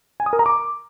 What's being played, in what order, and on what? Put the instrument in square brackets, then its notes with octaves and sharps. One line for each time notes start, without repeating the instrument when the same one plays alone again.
[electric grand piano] G#5
D#6
A#4
A#5
D6